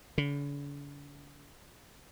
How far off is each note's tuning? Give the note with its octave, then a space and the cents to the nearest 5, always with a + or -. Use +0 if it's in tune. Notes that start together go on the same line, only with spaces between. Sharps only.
D3 -45